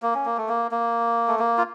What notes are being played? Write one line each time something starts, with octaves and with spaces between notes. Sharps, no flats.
A#3
C#4
A#3
A3
A#3
A#3
A3
A#3
F4